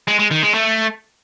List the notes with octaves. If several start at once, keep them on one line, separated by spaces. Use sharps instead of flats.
G#3
G#3
D#3
G#3
A3